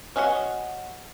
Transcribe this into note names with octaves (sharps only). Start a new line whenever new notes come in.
C#4 F#4 D#5 E5 F#5